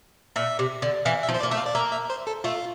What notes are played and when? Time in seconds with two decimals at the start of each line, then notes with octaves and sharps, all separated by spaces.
0.36 A#2 E5
0.59 C3
0.82 D3
1.05 E3 F5
1.23 E5
1.29 F3
1.34 C5
1.40 D5
1.43 A#3
1.51 A3 E5
1.58 F5
1.66 D5
1.75 A#3 E5
1.92 E5
2.10 C5
2.27 A4
2.44 A3 F4